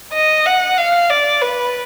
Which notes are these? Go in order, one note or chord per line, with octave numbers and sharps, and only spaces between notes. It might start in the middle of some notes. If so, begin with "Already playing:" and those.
D#5
F#5
F5
D5
B4